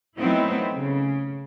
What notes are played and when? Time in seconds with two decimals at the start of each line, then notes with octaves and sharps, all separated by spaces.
0.18 F#3 A3 B3 C4 D#4 E4
0.73 C#3